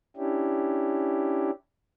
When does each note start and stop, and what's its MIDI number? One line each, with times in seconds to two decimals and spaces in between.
0.16 1.50 61
0.16 1.50 62
0.16 1.50 64
0.16 1.50 67